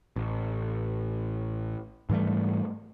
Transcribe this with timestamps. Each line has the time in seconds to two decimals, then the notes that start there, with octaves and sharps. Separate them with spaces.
0.16 A1
2.09 G#2 E3 G3 A3